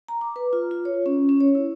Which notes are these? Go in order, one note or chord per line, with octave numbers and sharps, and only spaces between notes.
A#5
D6
B4
F4
F4
C#5
C#4
C#4
C#5
E4